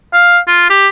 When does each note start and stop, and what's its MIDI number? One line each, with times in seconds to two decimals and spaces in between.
0.13 0.38 77
0.47 0.68 65
0.70 0.88 67